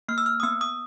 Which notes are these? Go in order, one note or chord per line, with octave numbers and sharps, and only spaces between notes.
A#3 F6
E6
F6
D#6
B3 E6
D#6